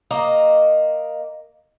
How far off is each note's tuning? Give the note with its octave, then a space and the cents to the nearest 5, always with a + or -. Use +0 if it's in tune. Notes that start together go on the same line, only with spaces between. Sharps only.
A#3 +0 D#5 -10